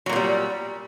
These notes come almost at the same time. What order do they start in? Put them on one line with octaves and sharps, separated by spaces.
F#3 A#2 A#3 G3